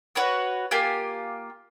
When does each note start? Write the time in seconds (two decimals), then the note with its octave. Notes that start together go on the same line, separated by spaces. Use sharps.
0.15 F#4 B4 C#5 F#5
0.71 A#3 F4 G4 G#5